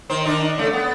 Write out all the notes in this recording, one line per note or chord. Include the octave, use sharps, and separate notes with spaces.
D#3 C5
D#3 D4 D#4
C#3 A3
B3